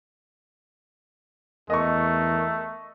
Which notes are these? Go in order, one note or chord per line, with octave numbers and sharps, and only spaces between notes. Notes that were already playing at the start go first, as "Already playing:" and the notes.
E2 A3 A#4 D#5 C#6